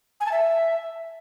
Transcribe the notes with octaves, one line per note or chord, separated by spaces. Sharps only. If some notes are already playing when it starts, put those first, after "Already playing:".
G#5
A5
E5